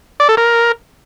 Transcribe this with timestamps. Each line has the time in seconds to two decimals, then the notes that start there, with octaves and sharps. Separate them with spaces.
0.20 D5
0.29 A4
0.37 A#4